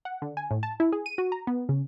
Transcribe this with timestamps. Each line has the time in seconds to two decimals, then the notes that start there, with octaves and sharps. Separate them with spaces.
0.05 F#5
0.22 D3
0.37 G#5
0.51 A2
0.63 A5
0.80 E4
0.92 G#4
1.06 D#7
1.18 F#4
1.32 A#5
1.47 B3
1.69 C#3